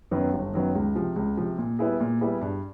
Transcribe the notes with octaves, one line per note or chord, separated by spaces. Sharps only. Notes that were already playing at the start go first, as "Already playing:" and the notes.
F#2 D#3 F#3 B3
G1
F#2 D#3 F#3 B3
C#2
C3 F3
C#2
C3 F3
A#2
G3 B3 E4 G#4
A#2
G3 B3 E4 G#4
G2